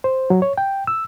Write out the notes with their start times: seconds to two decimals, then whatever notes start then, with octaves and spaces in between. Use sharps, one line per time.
0.04 C5
0.30 F#3
0.42 C#5
0.58 G5
0.87 E6